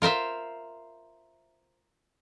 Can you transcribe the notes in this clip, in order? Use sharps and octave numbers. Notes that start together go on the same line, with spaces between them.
F4 A#4 C5 E5